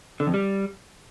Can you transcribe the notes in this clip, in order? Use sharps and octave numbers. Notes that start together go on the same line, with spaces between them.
D3
F2
G3